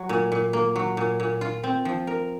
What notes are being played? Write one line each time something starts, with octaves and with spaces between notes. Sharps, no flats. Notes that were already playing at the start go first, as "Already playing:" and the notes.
Already playing: F#3
A#2
A#2
A#3
F#3
A#2
A#2
F4
C4
F3
A#4